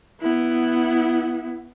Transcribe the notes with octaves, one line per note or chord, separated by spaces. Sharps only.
B3 E4